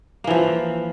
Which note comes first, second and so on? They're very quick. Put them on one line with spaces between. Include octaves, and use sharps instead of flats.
A#3 E3 F3